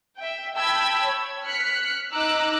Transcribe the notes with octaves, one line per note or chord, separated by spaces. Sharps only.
E5 G5
G5 A5 B5 E6 G#6
C#5
F6 F#6 B6 C#7
D#4 A#5 D6 E6 F#6